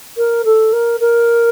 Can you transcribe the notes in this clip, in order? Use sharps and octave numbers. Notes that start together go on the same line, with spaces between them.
A#4
A4
A#4
A#4